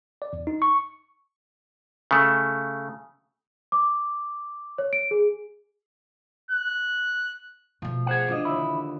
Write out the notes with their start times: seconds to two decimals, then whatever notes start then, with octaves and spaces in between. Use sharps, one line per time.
0.22 D5
0.33 E2
0.47 D#4
0.62 C#6
2.11 C#3 A3
3.72 D6
4.78 C#5
4.93 D7
5.11 G#4
6.50 F#6
7.82 B2 F3 A3
8.06 G#4 C5 F#5
8.28 E3 D4 F4 D#5
8.45 D#2 D3 E4